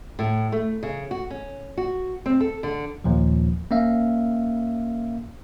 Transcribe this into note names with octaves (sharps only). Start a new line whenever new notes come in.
A2
A3
C#3
F#4
C#4
F#4
C4
A4
D3
D#2 A#2 F3
A#3 C#4 E5 F5